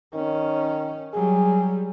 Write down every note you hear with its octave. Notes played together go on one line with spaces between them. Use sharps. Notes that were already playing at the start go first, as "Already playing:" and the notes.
D#3 C#4
F#3 G3 G#4